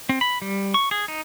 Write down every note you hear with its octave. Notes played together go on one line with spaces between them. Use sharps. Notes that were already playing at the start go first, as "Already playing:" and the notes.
C4
B5
G3
C#6
G#4
D#4